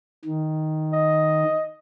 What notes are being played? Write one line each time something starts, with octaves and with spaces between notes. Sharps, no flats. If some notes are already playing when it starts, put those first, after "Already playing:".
D#3
D#5